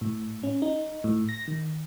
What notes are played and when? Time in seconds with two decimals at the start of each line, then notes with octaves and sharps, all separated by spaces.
0.01 A2
0.43 C#4
0.62 D#4
1.04 A2
1.29 A#6
1.48 D#3